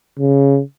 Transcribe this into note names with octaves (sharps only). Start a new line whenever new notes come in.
C#3